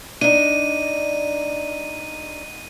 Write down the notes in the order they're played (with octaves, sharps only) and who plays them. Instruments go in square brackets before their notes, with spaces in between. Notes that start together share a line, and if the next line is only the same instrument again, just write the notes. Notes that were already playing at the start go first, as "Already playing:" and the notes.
[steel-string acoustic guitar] D4 D#4 [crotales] D#7